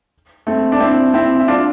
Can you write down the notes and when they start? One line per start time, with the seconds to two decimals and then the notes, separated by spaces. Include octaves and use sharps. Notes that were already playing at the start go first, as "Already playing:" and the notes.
0.47 A3 C4
0.72 D4
0.80 C4 E4
1.14 C4 E4
1.40 E4
1.48 D4 F4